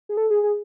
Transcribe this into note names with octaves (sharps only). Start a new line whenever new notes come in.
G#4
A4
G#4
G#4